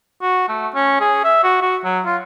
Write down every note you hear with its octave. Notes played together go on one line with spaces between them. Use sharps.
F#4
A3
C#4
G#4
E5
F#4
F#4
F#3
F4